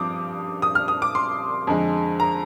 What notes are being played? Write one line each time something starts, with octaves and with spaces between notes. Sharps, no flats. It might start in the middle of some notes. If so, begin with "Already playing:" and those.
Already playing: G2 F3 C4 D6 D#6
D#6
F6
D#6
D6
C6
F2 D3 G#3
A#5